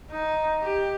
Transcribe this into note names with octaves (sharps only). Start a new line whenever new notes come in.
D#4
G4